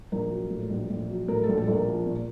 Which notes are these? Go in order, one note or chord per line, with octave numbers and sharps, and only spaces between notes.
A#1 A#4
F#3
A2
A#1
A#1
F#3
A2 A#4
A#1 A4
A4
A#1
A#4
F3
A#2